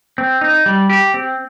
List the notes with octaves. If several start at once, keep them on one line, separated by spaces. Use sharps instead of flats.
C4
D#4
G3
G4
C4